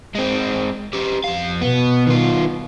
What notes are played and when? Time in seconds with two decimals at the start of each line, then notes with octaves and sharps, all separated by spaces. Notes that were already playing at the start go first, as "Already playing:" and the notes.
0.15 G#3 C4
0.93 C#4 G4
1.24 F2 F5
1.61 B2 B3
2.07 D#3 F4